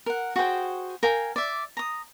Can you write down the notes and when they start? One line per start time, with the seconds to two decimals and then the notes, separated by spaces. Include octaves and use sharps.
0.06 A#4 F#5
0.36 F#4 G#4 C5 G5
1.03 A#4 F5 G5 G#5
1.36 D5 E5
1.77 A#5 D#6